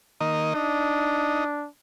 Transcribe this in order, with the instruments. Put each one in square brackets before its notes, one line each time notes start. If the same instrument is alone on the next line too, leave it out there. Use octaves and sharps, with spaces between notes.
[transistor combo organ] D#3 A#3 D#5
[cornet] D4 [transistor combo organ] D#4